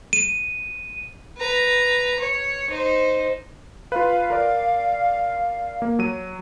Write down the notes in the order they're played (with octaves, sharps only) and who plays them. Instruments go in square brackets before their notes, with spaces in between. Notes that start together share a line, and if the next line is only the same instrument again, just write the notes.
[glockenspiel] D#7
[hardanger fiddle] B4 A#5
C#5
D#4 C5
[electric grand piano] F4 B4 [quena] F5
[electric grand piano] A#4 D5
A#3
F#3 D#7